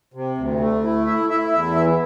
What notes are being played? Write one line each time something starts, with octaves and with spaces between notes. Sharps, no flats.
C3
D2
A3
E4
E4 E5
E4 E5
E2 E5
E3 E5